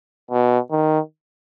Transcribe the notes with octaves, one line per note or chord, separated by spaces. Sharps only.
B2
D#3